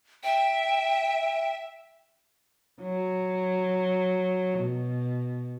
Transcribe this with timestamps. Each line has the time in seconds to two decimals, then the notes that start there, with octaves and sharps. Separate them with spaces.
0.24 E5 G5
2.82 F#3
4.60 B2